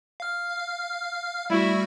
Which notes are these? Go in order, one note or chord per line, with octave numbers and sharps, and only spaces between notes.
F5 F6
G3 A3 E4 F#4